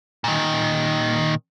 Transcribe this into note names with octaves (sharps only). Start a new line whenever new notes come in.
A#2 D#3